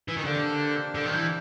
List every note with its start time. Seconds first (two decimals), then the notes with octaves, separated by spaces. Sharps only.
0.08 E3
0.17 D#3
0.24 D3 A#3 D4 G4 C5
0.95 D3
1.05 D#3
1.13 E3